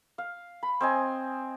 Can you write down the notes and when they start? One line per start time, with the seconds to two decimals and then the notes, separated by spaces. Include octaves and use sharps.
0.18 F5
0.63 B5
0.81 C4 D#5 G#5